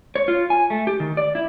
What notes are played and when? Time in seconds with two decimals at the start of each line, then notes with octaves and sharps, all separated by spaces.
0.15 C#5
0.28 F4
0.50 G#5
0.70 A3
0.87 G4
1.00 D#3
1.17 D5
1.35 E4